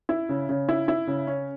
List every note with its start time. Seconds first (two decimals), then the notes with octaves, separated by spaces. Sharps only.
0.09 E4
0.29 C#3
0.49 C#3
0.69 E4
0.88 E4
1.07 C#3
1.27 C#4